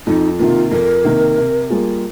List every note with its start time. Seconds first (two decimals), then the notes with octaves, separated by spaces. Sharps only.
0.07 F2 D#4
0.39 C3 D#3 A#3 F4
0.71 F2 A#4
1.05 C3 D#3 A#3
1.37 C3
1.70 G3 A#3 F4 G#4